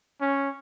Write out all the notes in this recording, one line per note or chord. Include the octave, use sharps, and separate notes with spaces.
C#4